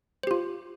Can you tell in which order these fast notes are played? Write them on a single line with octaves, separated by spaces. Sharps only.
C5 G4 F4